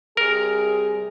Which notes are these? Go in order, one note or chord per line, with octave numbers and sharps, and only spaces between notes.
C3 G3 G#4 A#4